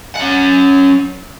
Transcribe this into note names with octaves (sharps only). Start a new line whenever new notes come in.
C#4 F#5